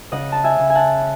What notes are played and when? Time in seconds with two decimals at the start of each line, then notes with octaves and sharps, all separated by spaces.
0.12 C#3 D#5 F#5
0.32 A5
0.44 E5 G#5
0.60 C#3
0.70 G#5
0.75 F#5 A5